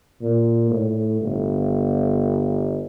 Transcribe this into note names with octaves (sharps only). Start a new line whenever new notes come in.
A#2
A2
G1